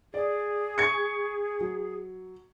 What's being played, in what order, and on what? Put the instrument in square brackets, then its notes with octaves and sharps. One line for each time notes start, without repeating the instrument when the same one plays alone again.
[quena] G#4 [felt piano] D5
[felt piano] C#6 G#6 C#7
F#3